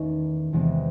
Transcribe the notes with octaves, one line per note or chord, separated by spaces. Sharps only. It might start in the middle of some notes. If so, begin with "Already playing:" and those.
Already playing: E2 D#3 A3 C#4
E2 C3 E3 G#3 C4